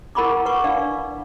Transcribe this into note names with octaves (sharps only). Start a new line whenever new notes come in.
E4 A#4 F#5 B5 C#6 D6
B4 F#5 C#6 D6
D4 D5 F5